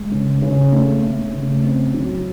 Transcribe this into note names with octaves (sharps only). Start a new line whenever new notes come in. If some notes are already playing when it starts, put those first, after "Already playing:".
Already playing: G#3
C#3
C#3
A3
A3
C#3
C4
F#3